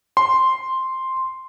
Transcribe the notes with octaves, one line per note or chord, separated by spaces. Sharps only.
C6